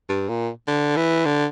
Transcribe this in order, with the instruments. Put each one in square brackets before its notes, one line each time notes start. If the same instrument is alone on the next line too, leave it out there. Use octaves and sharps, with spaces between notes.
[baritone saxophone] G2
A#2
D3
E3
D3